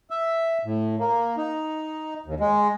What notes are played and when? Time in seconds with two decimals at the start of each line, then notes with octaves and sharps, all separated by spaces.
0.10 E5
0.65 A2
0.99 A#3
1.37 D#4
2.26 D#2
2.40 G#3